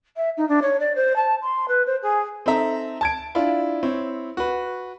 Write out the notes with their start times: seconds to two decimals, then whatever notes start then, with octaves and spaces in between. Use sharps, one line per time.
0.16 E5
0.37 D#4
0.48 D4
0.62 C#5
0.80 D5
0.95 C5
1.16 A5
1.41 C6
1.68 B4
1.86 C5
2.02 G#4
2.46 C4 D#4 A4 E5 A#5
3.01 A5 G#6 D7
3.35 D4 E4 F4
3.83 C4 E4 C#5
4.37 F#4 B4